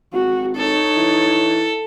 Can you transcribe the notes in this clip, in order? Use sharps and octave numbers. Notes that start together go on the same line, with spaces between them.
G#1 F#4
D#4 A4 C#5
E3